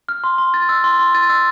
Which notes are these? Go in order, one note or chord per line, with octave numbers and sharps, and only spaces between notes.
F6
C6
C6
A6
E6
C6
C6
A6
E6